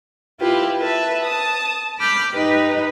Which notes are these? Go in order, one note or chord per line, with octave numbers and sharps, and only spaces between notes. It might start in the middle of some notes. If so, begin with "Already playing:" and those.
E4 F4 G4 B4
B4 E5 A5
A5 D#6
B5 D6 F6 G6
D#4 G4 B4